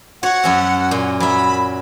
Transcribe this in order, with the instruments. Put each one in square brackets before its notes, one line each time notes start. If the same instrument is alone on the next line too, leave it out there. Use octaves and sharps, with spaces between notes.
[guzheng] F#4 C#5 [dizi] F#5
[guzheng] F#2 C#4 E5
A#2
[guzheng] F#3 E5 [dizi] B5